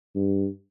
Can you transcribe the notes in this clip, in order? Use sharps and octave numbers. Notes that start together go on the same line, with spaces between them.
G2